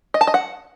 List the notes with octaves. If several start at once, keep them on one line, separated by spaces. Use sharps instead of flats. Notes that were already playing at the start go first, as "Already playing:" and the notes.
D#5
A5
D#5
F#5